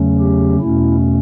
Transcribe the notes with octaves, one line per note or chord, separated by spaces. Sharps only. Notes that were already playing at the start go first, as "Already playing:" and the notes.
Already playing: E2 C#3 F#3 A3 C#4
G4
E2 B2 A3 C#4 E4